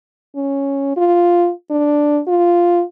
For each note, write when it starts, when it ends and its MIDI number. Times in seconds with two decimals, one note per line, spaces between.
0.36 0.92 61
0.97 1.51 65
1.71 2.21 62
2.27 2.83 65